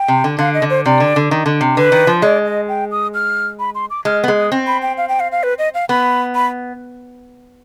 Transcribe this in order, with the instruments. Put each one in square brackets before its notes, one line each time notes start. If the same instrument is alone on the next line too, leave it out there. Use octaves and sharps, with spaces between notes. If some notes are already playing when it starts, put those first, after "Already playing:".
Already playing: [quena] G5
[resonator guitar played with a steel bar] C3
D3
[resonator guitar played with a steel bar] D3 [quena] F5
[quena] D#5
[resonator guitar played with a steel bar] D3
[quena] C5
[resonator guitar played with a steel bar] C3 [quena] D5
[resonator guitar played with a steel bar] D3
D3
D#3
D3
C3
[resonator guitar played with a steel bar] D3 [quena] B4
[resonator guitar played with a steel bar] D#3
F3
[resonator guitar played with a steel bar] G#3 [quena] D5
[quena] D#5
G5
D#6
F6
B5
C6
D6
[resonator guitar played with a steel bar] G#3 [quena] F6
[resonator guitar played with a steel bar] B3
G#3
[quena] D#6
[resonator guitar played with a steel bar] C4
[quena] B5
G5
F5
G5
F5
F5
B4
D#5
F5
[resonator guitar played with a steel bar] B3 [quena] B5
[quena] B5